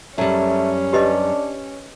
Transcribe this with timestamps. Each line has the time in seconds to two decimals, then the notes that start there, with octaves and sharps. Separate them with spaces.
0.18 F#2 G3 A3 C#4
0.93 D4 G4 B4 D#5